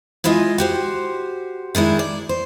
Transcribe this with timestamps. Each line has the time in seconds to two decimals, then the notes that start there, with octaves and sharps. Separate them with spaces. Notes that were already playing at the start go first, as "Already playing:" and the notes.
0.24 G#3 E4 F4 D#5 G#5
0.58 F#4 G4 C5
1.75 D#3 G#3 D4 E4
1.99 D5
2.29 C5